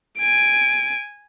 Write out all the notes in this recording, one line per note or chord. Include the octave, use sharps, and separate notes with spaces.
G#5 D7